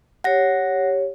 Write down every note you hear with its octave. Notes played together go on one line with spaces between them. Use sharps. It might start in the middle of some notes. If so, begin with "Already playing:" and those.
G4 C#5 F#5 A#6